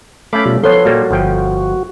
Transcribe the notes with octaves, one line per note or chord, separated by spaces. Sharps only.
A3 C#4 F5 B5 D6
B2 G3 F4
F3 B3 A4 C#5 C6
A#2 G3 A#3 F#4
G1 F3 G5